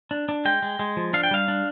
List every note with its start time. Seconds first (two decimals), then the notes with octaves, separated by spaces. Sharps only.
0.11 D4
0.29 D4
0.45 G#3 G5
0.62 G#3
0.79 G#3
0.97 F3
1.13 D4 F5
1.23 G5
1.31 G3 F5
1.48 D4